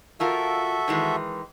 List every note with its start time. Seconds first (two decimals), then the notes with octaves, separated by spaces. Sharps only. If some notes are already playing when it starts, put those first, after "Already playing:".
0.20 F3 F4 F#4 A4 A#4 E5
0.88 D#3 E3 G#3